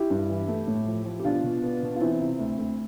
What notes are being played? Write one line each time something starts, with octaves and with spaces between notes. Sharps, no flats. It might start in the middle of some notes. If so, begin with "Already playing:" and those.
Already playing: E4 G4
G2
E3
A3
A2
F3
F3
G4
B2 D4 F4
B2
B3
B2
F4
E3 C4 E4
C3
D2
D2